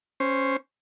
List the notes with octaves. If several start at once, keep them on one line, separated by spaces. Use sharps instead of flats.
C#4 C5